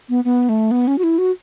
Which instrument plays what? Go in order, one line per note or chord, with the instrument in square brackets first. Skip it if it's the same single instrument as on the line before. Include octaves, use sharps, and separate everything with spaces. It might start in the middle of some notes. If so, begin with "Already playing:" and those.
[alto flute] B3
B3
A3
B3
C#4
F#4
E4
F#4